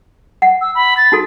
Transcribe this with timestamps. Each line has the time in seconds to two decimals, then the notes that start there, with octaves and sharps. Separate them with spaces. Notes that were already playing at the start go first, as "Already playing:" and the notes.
0.42 F#5
0.61 E6
0.75 B5
0.97 A6
1.12 D#4 F#4 A4